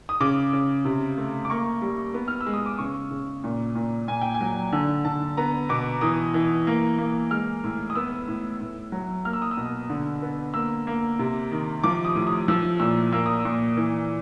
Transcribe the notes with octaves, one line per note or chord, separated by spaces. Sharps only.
D#6
C#3 D6
C#3
C3
A3
D6
A#3 C#6
G3
B3
F6
E6
G#3
D#6
D6
C#3 C#6
C#3
A#2
A#2
A#2 G#5
G5
G#5
F#3
D3 A5
D3 A5
B3 A#5
B2 D6
E3 D#6
E3
A#3
A#3
G#3 F6
A2
D#6
B3 E6
A2
A2
F#3
A#3 F6
E6
D#6
E6
B2
D3
B3
A#3 E6
A#3
C3
D#3
F3 D6
D#6
A2
D#6
F3 E6
A#2 E6
A#3 E6
D#6
E6
A#2
E3